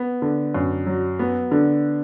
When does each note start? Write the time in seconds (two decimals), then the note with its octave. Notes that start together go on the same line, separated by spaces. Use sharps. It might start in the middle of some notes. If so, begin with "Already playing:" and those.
Already playing: B3
0.22 D3
0.54 F#2
0.87 F#3
1.19 B3
1.52 D3